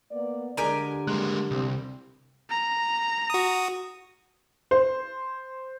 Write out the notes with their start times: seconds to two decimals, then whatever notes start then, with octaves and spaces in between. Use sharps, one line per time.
0.11 A#3 B3 D5
0.57 D3 G#3 G4 A#4 D5 G#5 A#5
1.07 G3 G#3 A#3 C6 F#6
1.51 C2 G3 C4
2.50 A#5
3.30 F#4 D#6
4.71 C5